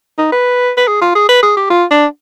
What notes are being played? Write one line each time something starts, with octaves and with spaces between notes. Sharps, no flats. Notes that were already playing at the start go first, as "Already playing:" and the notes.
D#4
B4
B4
G#4
F4
G#4
B4
G#4
G4
F4
D4